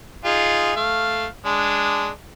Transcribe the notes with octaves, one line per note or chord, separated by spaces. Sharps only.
D#4 F4 G#4
A3 F5
G#3 D4